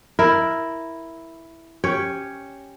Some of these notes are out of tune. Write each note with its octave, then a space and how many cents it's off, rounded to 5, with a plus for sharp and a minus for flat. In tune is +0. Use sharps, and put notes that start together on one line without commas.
E4 +0 A#4 +0
C#4 +0 G4 +0 C#5 +0